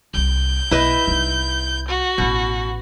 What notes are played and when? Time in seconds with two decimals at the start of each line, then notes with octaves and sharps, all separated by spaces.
0.14 C2 F4 G6
0.71 B1 E4 B4 D#5
1.08 C2 D#4
1.88 F#4
2.18 A1 B2 E4